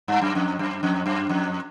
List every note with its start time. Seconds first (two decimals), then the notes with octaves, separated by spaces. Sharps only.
0.08 G2
0.22 F#2
0.35 F2
0.59 F#2
0.83 F2
1.06 F#2
1.29 F2